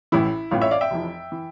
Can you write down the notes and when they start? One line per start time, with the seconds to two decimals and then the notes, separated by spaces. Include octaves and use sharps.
0.12 A1 A2 E3 E4
0.51 A1 A2 E3 F4
0.61 C#5 E5
0.71 D5 F5
0.81 E5 G5
0.91 F1 F2 E3
1.32 E3